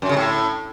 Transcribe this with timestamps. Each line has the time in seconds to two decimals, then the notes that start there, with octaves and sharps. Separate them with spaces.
0.02 F#2
0.09 C#3
0.17 A2